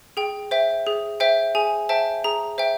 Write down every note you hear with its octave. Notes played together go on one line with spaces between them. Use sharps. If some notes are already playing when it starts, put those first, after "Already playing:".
G#4 G5
C5 E5 G5
G#4
C5 E5 G5
G#4 G#5
C5 E5 G5 A5
G#4 A#5
C5 E5 G5